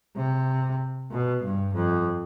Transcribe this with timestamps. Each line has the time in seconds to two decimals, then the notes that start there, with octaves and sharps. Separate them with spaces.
0.16 C3
1.11 B2
1.43 G2
1.74 F2